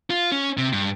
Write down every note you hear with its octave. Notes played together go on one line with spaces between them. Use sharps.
F4
C#4
C3
G2